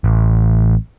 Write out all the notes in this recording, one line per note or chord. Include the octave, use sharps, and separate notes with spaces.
A1